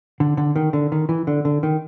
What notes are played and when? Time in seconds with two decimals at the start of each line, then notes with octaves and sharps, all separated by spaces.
0.20 D3
0.37 D3
0.56 D#3
0.73 D3
0.92 D#3
1.09 E3
1.27 D3
1.45 D3
1.63 D#3